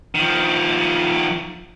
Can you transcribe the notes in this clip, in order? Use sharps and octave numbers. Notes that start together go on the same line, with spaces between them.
D#3 F3